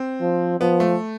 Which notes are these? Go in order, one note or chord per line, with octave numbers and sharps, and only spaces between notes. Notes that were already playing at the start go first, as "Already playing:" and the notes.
Already playing: C4
F3
F3 B3
A3